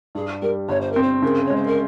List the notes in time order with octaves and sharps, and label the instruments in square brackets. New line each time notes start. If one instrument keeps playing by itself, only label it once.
[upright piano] G2 [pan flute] G#4
[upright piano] G3 [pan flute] A#4
[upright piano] G1 [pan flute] C#5
[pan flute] C5
[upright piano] C4 [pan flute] A#4
[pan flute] C5
[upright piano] C#3 [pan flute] A#4
[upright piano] G#3 [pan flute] C#5
[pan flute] C5
A#4